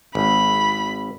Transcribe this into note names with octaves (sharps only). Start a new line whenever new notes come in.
G#1 B5